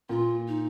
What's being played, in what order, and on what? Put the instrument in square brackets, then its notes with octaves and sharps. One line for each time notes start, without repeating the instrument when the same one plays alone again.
[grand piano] A#2 [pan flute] F4
[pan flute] D#4